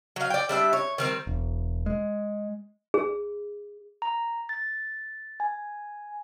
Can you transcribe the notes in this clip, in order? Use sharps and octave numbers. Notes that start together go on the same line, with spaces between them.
F#3 F5
D5 G5
G3 D4 E5
C#5
D#3 G3 C4
E1
G#3
G#4
A#5
A6
G#5